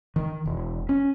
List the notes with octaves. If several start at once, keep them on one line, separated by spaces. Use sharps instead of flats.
D#3
E1
C#4